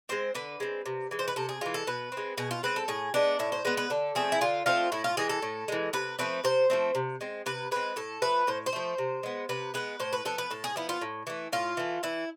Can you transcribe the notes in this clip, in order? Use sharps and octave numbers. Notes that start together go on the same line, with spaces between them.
G#3 C4 C5
D3 B4
G#3 C4
C3
E3 G#3
C5
B4
C3 A4
G#4
E3 G#3 F4
A4
B2 B4
C4
G#3
B2 G#4
F4
G#3 C4 B4
A4
A2 G#4
G#3 B3 D4
A2 E4
C5
G#3 B3 B4
B4
D3 A4
F3 A3 C4 G#4
E4
D3 F4
F3 A3 C4 F4
A2 E4
F4
E3 G#3 G#4
A4
A2
E3 G#3
C3 B4
F3 A3 C4 B4
C3 C5
F3 A3 C4
C3
G#3 C4
C3 B4
G#3 C4 B4
A2 A4
F3 A3 B4
A2 C5
C5
F3 A3
C3
G#3 B3
C3 B4
G#3 B3 B4
A2 C5
B4
F3 B3 A4
B4
A2 A4
G#4
F3 B3 E4
F4
A2
E3 A3
A2 F4
E3 A3
E3 E4